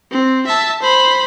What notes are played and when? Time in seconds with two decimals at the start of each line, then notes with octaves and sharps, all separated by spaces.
0.11 C4
0.47 E5 A5
0.82 C5 B5